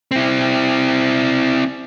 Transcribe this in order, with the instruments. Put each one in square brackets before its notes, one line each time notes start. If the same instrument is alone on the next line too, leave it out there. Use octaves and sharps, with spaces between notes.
[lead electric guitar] C4 E4